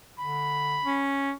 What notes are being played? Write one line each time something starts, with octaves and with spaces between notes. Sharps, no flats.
D3 B5
C#4